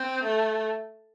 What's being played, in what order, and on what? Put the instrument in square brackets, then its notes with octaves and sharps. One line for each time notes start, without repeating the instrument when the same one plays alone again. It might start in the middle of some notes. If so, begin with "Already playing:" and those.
Already playing: [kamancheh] C4
A3